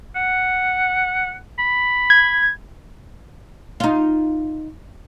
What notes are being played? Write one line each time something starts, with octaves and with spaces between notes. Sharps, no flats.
F#5
B5
G#6
D#4 F4